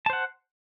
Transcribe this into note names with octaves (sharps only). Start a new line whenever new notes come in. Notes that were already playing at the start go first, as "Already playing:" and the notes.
C5 F#5 A5